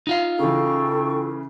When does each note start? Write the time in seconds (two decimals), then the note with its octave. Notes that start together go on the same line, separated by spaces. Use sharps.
0.07 D#4 F4 F5
0.39 C#3 E3 A4 G5 C#6